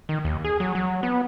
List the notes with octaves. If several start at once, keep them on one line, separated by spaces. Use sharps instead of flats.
D#3
D#2
G#4
F#3
F#3
B3